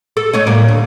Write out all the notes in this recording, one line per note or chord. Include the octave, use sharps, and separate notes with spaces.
A4
A3 C#5 D#5
A2 G3 A#3
D2